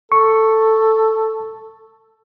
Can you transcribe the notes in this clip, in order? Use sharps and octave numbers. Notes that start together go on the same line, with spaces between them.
A4 C#6